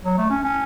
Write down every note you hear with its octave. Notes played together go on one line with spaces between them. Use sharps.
F#3
A3
C#4
C#4